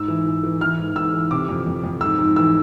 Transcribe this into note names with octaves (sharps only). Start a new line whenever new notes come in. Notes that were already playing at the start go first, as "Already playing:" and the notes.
Already playing: G#2 E6
E3
E3
E3
E3 F6
G#2
G#2 E6
E3
C3 D6
F2
F2
F2
G#2 E6
G#2
E3 E6